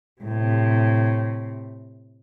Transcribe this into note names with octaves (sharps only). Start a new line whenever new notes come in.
A2 C3